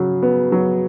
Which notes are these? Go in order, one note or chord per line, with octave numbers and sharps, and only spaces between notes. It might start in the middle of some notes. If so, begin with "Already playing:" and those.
Already playing: C#3 F#3
B3
F#3